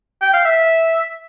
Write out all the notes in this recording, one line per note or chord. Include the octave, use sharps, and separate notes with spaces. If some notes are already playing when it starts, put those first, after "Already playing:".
G5
F5
E5